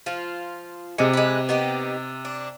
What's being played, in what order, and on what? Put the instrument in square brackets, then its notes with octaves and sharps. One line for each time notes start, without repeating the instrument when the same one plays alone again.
[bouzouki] F3 F4
[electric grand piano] C3 D6 C#7 [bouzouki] G#3
[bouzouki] G#3 B4
B3 D#4 G4
D4